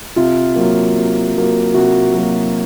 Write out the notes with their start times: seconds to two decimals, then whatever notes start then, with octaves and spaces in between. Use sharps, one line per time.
0.16 C3 F4
0.56 F#3 A#3
0.95 C3
1.35 F#3 A#3
1.74 C3 F#4
2.14 F#3 A#3